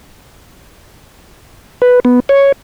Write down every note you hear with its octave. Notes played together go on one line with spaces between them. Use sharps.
B4
B3
C#5